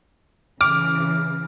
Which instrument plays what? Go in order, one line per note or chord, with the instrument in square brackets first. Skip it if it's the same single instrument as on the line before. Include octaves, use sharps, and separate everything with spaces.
[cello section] C#3 E3 [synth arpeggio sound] D6 [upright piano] F6